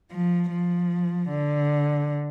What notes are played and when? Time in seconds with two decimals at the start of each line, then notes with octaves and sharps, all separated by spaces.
0.11 F3
0.51 F3
1.30 D3